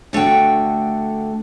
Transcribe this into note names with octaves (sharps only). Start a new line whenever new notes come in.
D3 A3 F#4 G5